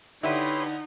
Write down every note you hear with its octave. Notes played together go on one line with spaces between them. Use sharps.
D3 D#4 E4 G4 B4 C#5 B5 C6